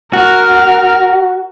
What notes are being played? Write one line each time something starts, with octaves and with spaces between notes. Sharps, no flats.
F#4 A#4 F6